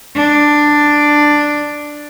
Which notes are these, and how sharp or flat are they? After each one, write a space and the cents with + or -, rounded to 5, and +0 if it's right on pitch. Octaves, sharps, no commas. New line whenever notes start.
D4 +5